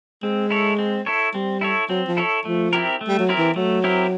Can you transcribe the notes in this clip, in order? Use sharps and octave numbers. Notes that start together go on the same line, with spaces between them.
G#3 C4
E4 A4 C#5
C4
E4 A4 C#5
G3 C4
E4 A4 C#5
F#3 C4
F3
E4 A4 C#5
F3 A3
C4 E4 G4 A#4
A3
G3
F#3
C4 E4 G4 A#4
E3
F#3 A3
C4 E4 G4 A#4